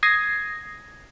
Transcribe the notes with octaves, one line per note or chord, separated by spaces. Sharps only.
D#6 G#6 A#6 C7